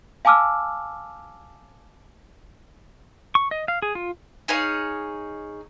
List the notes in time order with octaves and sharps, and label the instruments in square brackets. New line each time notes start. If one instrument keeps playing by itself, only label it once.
[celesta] F5 G#5 A5 D6 E6 F6
[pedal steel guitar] C#6
D#5
F5
G#4
F4
[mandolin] D#4 G#4 C#5 F5